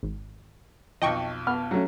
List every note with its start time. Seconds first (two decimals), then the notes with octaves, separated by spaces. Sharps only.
0.03 G#1
1.02 B1 F2 D#5 G5 C#6
1.47 B3 F6
1.71 F#3 A3 C#4